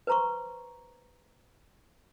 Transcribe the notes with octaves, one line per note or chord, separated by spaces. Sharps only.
B4 C5 A#5 C6 C#6